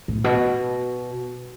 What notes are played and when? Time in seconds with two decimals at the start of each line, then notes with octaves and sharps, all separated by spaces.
0.08 A2
0.24 B2